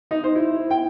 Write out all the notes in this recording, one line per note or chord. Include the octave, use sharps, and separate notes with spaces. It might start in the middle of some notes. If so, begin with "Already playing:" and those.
D#4
C5
E4
G5